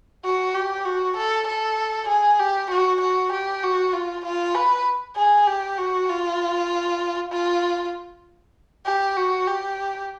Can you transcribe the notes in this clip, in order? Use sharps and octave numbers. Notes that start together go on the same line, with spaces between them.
F#4
G4
F#4
A4
A4
G#4
G4
F#4
F#4
G4
F#4
F4
F4
B4
G#4
G4
F#4
F4
F4
G4
F#4
G4